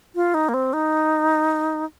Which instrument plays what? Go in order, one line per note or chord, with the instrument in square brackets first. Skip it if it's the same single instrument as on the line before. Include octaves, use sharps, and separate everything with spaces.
[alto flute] F4
D#4
A#3
C4
D#4